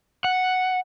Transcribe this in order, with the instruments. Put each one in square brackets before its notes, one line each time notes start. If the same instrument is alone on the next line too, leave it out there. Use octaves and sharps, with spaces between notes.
[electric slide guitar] F#5